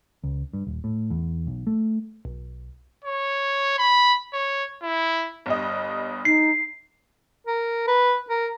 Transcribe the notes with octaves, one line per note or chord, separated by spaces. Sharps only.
C#2
G2
D#1
A2
E2
B1
A3
B1
C#5
B5
C#5
E4
G1 G2 D#5
D#4 C7
A#4
B4
A#4